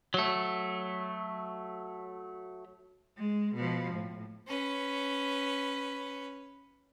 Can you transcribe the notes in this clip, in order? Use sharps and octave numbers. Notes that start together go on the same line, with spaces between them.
F#3 A3
G#3
B2 F3
A2
C#4 B4